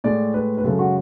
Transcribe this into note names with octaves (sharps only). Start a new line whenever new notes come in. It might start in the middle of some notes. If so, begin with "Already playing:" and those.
A2 G#3 D5
B4
B4
F#2 C#3 G#3 A4
F#4